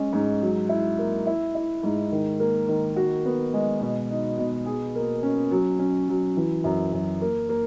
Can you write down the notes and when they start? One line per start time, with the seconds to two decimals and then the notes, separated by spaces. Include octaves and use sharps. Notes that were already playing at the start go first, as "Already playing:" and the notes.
Already playing: G#3 C#4
0.13 G#2
0.42 F#3
0.69 E4
0.99 A#3
1.27 E4
1.55 E4
1.83 G#2
2.12 D#3
2.40 A#3
2.69 D#3
2.96 F#4
3.25 B3
3.54 G#3
3.81 B2
4.10 D#4
4.38 B2
4.66 G#4
4.95 A#3
5.23 C#4
5.51 F#3
5.79 C#4
6.09 F#3
6.37 E3
6.64 F#2
6.92 F#2
7.22 A#3
7.49 A#3